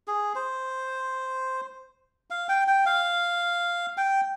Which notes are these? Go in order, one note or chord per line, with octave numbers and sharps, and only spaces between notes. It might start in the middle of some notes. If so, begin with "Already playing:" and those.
G#4
C5
F5
G5
G5
F5
G5